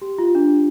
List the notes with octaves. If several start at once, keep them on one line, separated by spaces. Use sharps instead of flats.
G4
F4
D4